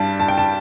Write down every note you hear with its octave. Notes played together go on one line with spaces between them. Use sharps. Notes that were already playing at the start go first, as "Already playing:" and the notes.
Already playing: G2 G3 D4 A5
A5
G5
A5